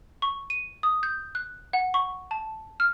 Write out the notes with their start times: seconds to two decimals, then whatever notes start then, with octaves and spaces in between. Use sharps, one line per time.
0.22 C#6
0.50 D#7
0.83 D#6
1.03 G6
1.35 F#6
1.73 F#5
1.94 C#6
2.31 A5
2.80 F6